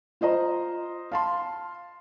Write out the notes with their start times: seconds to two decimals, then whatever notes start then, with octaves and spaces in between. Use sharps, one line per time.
0.21 F4 C5 D#5 A#5
1.12 F5 A5 C6